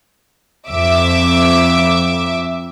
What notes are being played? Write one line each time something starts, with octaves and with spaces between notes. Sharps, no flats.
F2 E5 D6